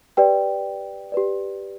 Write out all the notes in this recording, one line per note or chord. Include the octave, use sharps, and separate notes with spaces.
G4 B4 D5 G5
G4 B4 D5